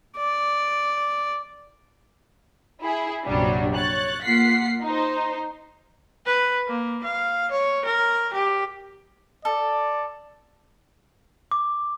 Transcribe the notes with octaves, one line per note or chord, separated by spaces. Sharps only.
D5
E4 G#4
A#1 F#2 C3 F#3 G3 D4
C#5 F#6 A6
A#3 F4 F#5 B6 C7
D#4 C5
B4
A#3
F5
C#5
A#4
G4
A4 D5
D6